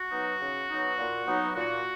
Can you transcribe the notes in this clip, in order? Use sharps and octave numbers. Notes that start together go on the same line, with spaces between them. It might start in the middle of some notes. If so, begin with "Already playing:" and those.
Already playing: F#4
F#3 B3 D#4
C#3
F#3 B3 D#4
A#2
F#3 B3 D#4
A#2 F#4